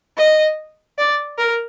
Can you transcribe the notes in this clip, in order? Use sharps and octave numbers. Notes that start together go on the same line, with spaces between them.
D#5
D5
A#4